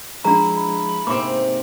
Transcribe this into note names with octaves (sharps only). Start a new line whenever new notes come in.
F3 G#3 D4 E4 G#4 A#5 B5
B5
G#2 C3 A#3 C4 D6